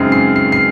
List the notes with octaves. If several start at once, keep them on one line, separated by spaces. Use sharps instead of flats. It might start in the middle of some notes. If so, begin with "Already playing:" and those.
Already playing: F#2 C#3 G#3 C4 D#4 C7
C7
C7
C7